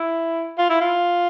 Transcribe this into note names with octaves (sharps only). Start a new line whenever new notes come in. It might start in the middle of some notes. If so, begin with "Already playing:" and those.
Already playing: E4
F4
E4
F4